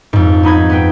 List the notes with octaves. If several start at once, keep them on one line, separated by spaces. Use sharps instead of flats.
F2 G#2
B3 D#4 B5 G#6
B3 B4 G5